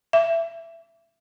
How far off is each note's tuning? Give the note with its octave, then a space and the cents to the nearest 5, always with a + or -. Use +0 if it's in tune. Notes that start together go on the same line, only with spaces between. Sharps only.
E5 +20